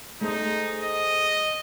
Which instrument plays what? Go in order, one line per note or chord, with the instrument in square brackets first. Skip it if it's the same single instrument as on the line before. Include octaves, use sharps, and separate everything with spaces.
[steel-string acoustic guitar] A3 G#4 C5 [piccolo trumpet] D#4
[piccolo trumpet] D#5